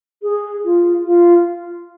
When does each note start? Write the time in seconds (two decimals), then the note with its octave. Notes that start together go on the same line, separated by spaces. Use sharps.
0.23 G#4
0.64 F4
1.05 F4